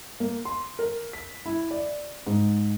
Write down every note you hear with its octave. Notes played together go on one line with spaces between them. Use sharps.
A#3
C6
A#4
B6
E4
D5
G#2